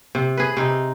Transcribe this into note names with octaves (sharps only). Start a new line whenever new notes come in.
C3
G#4 B4
C3 D#4